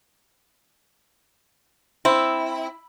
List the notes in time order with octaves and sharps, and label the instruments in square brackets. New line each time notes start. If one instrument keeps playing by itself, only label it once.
[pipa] C4 [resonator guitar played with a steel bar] E4